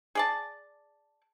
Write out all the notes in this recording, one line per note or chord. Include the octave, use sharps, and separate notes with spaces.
G#4 D5 A5